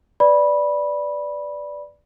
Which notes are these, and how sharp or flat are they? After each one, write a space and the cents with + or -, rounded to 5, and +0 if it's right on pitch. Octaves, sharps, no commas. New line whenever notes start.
B4 +10 D5 +0 B5 -15